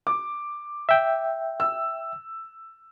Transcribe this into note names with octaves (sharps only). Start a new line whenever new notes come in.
D6
E5 G5
E6